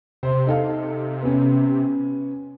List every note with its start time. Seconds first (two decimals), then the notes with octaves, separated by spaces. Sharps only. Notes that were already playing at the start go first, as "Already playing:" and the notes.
0.23 C3 C5
0.47 D#4 A4 F5
1.23 B3 C#4